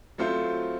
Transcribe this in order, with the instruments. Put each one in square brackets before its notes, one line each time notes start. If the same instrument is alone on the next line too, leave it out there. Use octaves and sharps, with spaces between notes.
[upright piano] F#3 A3 C4 F4 C5